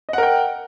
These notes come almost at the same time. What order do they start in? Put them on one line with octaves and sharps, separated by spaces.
D#5 F#5 A#4 G5